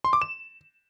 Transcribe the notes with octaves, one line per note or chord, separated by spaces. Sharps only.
C6
D6
E7